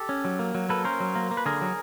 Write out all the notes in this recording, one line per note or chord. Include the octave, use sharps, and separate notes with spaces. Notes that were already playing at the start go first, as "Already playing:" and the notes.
Already playing: G4 A4
C#4
F#3
A#3
F#3
A#3 A4 B4
C#4 A#4 C5
F#3
A#3
A#3
B4
D3 G#4 A#4
F#3